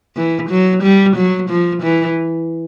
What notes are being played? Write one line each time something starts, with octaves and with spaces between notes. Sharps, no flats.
E3
F#3
G3
F#3
F3
E3